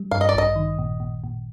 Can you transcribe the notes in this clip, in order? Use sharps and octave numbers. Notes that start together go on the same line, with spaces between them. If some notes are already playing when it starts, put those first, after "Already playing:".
Already playing: G3
G2 F5
D#5
D5
A1 D#5
D#3
A#2
A#2
A#2